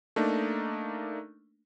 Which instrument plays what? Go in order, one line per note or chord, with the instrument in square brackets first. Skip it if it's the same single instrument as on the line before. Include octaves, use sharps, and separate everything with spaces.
[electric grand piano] A3 A#3 D4 D#4